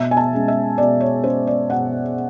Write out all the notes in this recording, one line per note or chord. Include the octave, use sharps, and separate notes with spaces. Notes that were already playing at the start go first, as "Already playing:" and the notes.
Already playing: B2 E5
G#5
A5
G#3 C#4
E5
B2 D5
C#5
G#3 C#4 C5
D5
B2 F#5